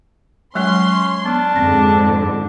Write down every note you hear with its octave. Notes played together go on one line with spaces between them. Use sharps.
F#3 G#3 C#4 C#5 C6
B3 D4
F2 G#2 D3 C4